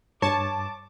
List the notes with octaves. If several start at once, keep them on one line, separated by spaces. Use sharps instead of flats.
G2 C#5 A5 D6